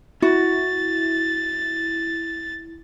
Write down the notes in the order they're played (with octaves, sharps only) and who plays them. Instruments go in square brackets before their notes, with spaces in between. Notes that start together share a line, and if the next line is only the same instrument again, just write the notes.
[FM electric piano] E4 [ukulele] F#4 [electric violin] A6